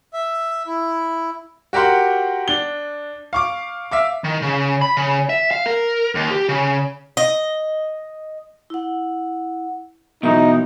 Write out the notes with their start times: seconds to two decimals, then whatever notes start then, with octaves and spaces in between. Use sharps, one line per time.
0.14 E5
0.67 E4
1.73 F#4 G4 A#4 F#5 C6
2.48 D4 G7
3.33 F5 C#6 D6
3.91 E5 F5 D6
4.24 D#3
4.42 C#3
4.81 B5
4.97 C#3
5.29 E5
5.51 F5
5.66 A#4
6.15 D#2
6.31 G4
6.49 C#3
7.17 D#5
8.70 E4 F#5
10.23 B2 E3 F#3 D#4 E5